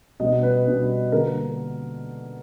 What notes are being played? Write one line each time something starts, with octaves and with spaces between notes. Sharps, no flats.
B2 G3 B3 D4 D#5
B4
B2 G3 B3 D4
D3 G3 A#3 A#4